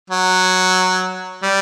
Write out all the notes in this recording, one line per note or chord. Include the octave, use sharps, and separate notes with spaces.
F#3
G3